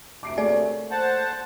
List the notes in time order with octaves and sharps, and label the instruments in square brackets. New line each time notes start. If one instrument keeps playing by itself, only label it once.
[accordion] D2 C3 [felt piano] D6 C7 D7
[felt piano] A3 A#3 C#5 [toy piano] G#4 D5 G#5
[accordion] C5 F#5 A5